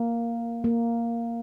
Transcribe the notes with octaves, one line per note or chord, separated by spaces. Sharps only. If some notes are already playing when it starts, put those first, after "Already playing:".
Already playing: A#3
A#3